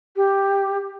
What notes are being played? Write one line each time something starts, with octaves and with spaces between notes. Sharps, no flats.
G4